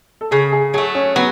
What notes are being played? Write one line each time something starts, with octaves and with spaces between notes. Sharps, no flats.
A4
C#3 G#4
G#4
F#3 A3 G#4
C#4
F#3 B3